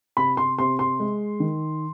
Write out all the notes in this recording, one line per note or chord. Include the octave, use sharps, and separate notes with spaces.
C3 B5
C6
C3 C6
C6
G#3
D#3